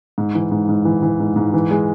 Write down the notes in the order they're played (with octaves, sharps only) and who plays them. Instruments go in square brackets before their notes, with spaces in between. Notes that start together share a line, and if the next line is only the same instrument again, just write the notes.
[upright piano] G#2
E3
G#2
G#2
E3
E3
G#2
G#2
E3
G#3